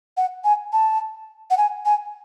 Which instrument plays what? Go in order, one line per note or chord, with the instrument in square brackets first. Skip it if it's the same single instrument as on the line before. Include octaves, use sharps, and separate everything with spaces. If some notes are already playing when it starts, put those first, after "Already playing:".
[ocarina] F#5
G#5
A5
F#5
G#5
G#5